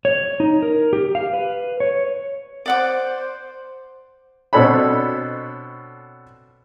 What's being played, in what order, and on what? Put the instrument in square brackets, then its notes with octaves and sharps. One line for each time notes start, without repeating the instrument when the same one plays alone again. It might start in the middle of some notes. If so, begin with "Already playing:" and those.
[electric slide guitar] C#5
D#4
A#4
G4
F5
B4
C#5
[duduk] C5 [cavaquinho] D5 F#5 D6
[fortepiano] B2 C4 D4 A4 C#5 B5